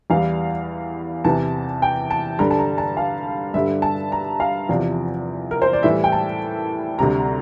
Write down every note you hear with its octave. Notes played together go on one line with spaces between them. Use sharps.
E2 E3 G3 F5
E2 C3 E3 A5
G5
A5
G2 D3 G3 A#5
A5
A#5
A5
F5
G2 D3 G3 E5
A5
A#5
F5
E2 C3 F3 D5
A#4
C5
D5
A2 E3 G3 E5
G5
A5
D2 C3 G3 A#5